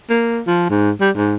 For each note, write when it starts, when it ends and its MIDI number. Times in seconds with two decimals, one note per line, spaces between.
0.10 0.41 58
0.47 0.67 53
0.70 0.91 44
1.01 1.10 55
1.16 1.36 44